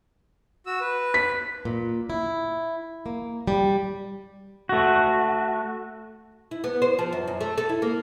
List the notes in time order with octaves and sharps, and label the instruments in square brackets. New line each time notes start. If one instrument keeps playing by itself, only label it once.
[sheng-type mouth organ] F#4 E6
B4
[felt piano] B6
[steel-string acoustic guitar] A#2
E4
A#3
G3
[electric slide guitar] A3 F#4
[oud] E4
B3
C5
F3
F#2
F#2
A3
A4
E4
A#3